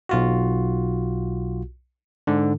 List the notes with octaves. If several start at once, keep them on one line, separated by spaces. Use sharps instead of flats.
B1 F4 F#4
G#2 D3